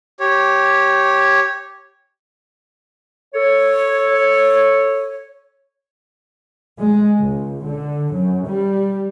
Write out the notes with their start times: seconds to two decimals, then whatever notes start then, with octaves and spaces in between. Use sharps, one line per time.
0.20 G4 C#5
3.34 A4 C#5
6.79 G#3
7.19 C#2
7.66 D3
8.14 F#2
8.46 G3